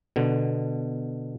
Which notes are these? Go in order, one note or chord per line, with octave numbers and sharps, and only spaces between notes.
B2 D3